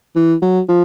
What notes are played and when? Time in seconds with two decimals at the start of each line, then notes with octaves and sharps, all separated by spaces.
0.16 E3
0.42 F#3
0.68 F3